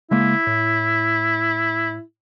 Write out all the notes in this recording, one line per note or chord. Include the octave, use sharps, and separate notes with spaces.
C#3 G#3 A#3 E4
A2